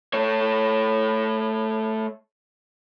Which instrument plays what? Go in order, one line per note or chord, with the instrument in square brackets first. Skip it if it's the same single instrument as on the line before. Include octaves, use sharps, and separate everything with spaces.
[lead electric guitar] A3 C#5